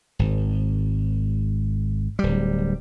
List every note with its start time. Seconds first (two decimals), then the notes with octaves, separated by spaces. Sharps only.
0.19 G#1
2.19 D1 G3